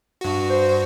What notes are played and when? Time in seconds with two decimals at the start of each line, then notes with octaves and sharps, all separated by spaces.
0.21 G2 F#4
0.50 C5